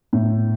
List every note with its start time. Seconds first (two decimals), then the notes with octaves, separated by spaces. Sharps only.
0.13 A2